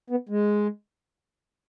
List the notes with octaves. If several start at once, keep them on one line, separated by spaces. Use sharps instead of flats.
B3
G#3